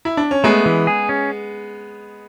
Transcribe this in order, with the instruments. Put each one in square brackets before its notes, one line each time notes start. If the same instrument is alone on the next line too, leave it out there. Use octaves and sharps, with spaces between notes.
[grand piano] E4
D4
C#4
[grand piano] G#3 B3 [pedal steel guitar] A3
[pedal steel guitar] E3
G#4
C#4